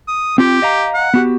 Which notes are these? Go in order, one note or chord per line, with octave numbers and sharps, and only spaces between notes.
D#6
C4 F4 G4
D#5 F5 A#5
F#5
B3 F#4 G4